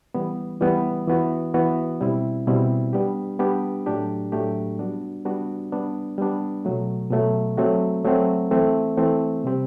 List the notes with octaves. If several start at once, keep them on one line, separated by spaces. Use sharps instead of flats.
E3 G3 B3
E3 G3 B3
E3 B3 F#4
E3 B3 F#4
B2 G3 C4 E4
B2 G3 C4 E4
G3 B3 D4 G4
G3 B3 D4 G4
A2 F#3 A3 D4 G4
A2 F#3 A3 D4 G4
G3 B3 D4 F#4
G3 B3 D4 F#4
G3 B3 D4
G3 B3 D4
B2 F#3 A3
B2 F#3 A3
F#3 A3 C4 F#4
F#3 A3 C4 F#4
E3 A3 C4
E3 A3 C4
C3 G3 C4 G4